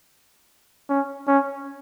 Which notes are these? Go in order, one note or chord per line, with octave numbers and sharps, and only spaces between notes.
C#4
C#4